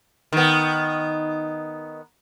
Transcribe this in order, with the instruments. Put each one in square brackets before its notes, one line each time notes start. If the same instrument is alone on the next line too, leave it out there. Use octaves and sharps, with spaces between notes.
[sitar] D#3 B3